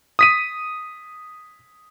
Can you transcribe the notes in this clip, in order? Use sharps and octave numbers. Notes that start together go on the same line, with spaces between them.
D#6 B6 D#7